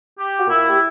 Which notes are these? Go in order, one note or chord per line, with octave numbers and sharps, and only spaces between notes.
G4
F#4
A#2 E4
G4